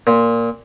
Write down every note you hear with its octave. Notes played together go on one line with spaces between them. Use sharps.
A#2